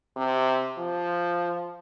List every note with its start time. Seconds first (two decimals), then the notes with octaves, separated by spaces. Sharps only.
0.17 C3
0.78 F3